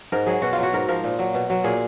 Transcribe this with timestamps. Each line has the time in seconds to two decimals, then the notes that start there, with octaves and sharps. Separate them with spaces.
0.12 G#2 A#4
0.26 F#3 G#4
0.42 B2 F#4
0.53 F4
0.58 F#3
0.63 F#4
0.73 G#2 A#4
0.88 F3 A#4
1.04 A#2
1.19 F#3
1.34 B2
1.50 F#3
1.64 A#2 G#4